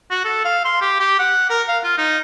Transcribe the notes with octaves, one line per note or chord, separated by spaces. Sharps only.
F#4
A4
F5
C6
G4
G4
F#5
A#4
F5
F4
D#4